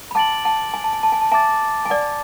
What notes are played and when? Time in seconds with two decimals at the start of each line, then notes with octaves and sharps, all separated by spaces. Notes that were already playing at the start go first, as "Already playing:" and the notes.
0.11 B5
0.15 F#5 A5 D6 A6 D7 F#7
0.45 F#5 A5
0.74 G#5
0.84 A5
0.93 G#5
1.03 A5
1.12 G#5
1.21 A5
1.31 E5 G#5 A5 D6 A6
1.85 G#5
1.90 D5 F#5